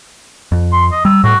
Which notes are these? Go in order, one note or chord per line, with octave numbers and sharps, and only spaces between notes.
F2
C6
D#5
G3 E6
A2 F#4